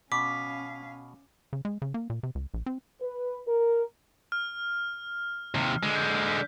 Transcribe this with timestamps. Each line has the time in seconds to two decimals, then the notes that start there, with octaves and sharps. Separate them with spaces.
0.12 B2 C#4 F5 D6 B6
1.53 C#3
1.65 G#3
1.82 C#3
1.94 A#3
2.10 A#2
2.23 C3
2.35 C#2
2.54 A#1
2.66 C4
3.01 B4
3.48 A#4
4.32 F6
5.55 D#2 C3
5.83 D3 G#3
5.96 G6
6.27 B6